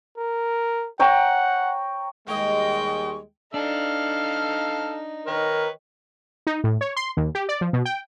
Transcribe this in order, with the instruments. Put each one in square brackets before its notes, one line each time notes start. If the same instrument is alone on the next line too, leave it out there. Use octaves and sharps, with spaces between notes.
[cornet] A#4
[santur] C#5 G5 A#5 [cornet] F#5
[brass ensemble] D#2 G3 G#3 [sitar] A#3 D#5 [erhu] G5 [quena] C#6
[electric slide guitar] D4 [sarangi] D#4 [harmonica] A4 F5 F6
[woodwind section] D#3 A#4 [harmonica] B4 C#5
[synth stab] D#4
A2
C#5
C6
D#2
G4
D5
F3
B2
G5